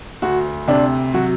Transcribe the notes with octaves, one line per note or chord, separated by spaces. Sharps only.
D2 F#4
C3 D4
F#3 F#4